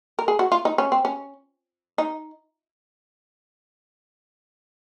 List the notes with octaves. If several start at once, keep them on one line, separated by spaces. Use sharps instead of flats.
A#4
G#4
F#4
F4
D#4
C#4
C4
C#4
D#4